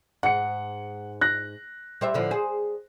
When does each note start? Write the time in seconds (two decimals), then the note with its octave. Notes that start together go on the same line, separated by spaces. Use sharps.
0.23 G#2 F#5 C#7
1.21 F#6 A#6
2.01 G3 C5 E5
2.14 A2 D3 F3
2.31 G#4 C5